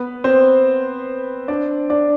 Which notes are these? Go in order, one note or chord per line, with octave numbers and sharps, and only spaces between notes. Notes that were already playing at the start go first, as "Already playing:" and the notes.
Already playing: B3 B4
C4 C5
D4 D5
D4 D5